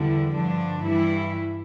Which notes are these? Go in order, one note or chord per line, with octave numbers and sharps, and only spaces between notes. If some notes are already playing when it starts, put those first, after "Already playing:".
Already playing: E2 D3 G3 E4
G2 D3 F3 D4
G2 E3 G3 E4